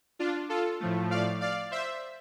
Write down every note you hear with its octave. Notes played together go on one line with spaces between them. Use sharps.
D4 F4
F4 A4
A2 F3 A3
D5 F5
D5 F5
C5 E5